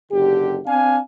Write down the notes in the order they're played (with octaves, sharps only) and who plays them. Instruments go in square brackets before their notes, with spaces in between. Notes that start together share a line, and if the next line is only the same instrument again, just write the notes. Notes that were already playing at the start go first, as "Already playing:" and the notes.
[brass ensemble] F#1 D3 G4
C4 D4 F5 G#5